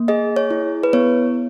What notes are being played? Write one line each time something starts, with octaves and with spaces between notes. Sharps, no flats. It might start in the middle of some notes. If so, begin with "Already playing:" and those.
Already playing: A#3
G#4 D#5
C#5
E4
B4
B3 C#5